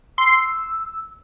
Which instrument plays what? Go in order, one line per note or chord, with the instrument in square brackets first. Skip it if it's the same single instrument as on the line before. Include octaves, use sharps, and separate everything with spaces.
[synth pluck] C6 C7 [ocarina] E6